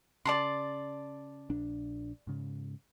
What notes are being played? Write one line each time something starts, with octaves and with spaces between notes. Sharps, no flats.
C#3 D5 A5 C6
A#1 D4
G#2 C#3